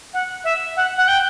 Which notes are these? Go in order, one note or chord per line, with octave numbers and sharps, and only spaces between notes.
F#5
E5
F#5
F#5
G5